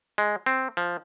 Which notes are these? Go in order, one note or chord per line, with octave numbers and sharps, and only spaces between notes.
G#3
C4
F3